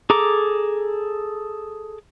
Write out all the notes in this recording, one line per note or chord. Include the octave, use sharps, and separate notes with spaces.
G#4 A4 A#5 D6